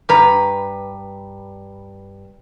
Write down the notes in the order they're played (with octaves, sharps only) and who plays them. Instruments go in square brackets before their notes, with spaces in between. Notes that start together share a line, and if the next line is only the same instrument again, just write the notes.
[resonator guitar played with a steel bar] G2 B4 A#5